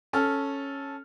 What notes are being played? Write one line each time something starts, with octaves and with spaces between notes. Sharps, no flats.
C#4 A4 F6